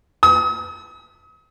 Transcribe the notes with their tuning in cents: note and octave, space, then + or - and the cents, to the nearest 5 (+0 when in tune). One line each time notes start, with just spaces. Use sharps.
D#6 +40